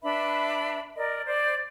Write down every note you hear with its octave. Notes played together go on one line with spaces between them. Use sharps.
D4 B4 E5 B5
A#4 D5 D#5
C5 D5